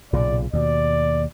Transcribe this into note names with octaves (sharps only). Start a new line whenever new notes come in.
B1 A#2 C#3 D5
D#2 B2 D5